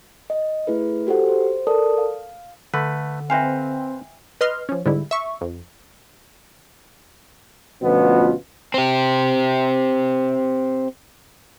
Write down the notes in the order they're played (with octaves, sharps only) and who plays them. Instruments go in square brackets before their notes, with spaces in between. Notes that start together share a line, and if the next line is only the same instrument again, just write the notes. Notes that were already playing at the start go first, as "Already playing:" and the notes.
[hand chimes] D#5
A3 E4 G#4 B4
F#4 G4 A4 C5 F#5
C5
A4 A#4 D5 A5 D#6
F5
[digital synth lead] D3 [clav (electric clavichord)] A3 B4
[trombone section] C4 [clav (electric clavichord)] B4 C5 F5 [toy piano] E5 G5 G#5
[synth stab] B4 D#5 C6 F6
F3 C#4
G#2 D3 G3 E4
E5 C#6
F2
[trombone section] D2 B2 F3 B3 C#4 F4
[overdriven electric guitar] C4 G4